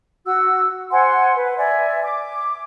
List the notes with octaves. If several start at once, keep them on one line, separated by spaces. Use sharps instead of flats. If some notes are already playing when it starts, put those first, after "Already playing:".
F#4 E6
C5 F#5 G#5 C6
B4
D5 E5 G#5
D6